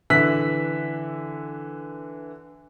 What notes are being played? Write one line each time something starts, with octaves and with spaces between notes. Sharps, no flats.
D3 E3 E5 E6 F#6 B6